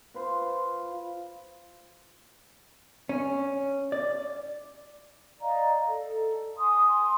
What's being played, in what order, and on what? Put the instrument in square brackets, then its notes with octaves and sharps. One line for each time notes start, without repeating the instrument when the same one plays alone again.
[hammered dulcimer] F4 B4 C5
[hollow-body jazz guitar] C#4
D5
[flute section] D5 D#5 F5 A#5
A4
G#5 C6 D#6